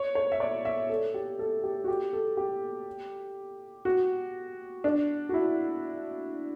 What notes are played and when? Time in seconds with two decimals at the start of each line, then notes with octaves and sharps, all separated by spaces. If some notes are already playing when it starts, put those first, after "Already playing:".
Already playing: C#5
0.15 C#5
0.32 E5
0.40 D5
0.65 E5
0.89 A4
1.14 G4
1.39 A4
1.64 G4
1.84 F#4
1.88 G4
2.13 A4
2.37 G4
3.85 F#4
4.84 D4
5.29 F#4
5.34 E4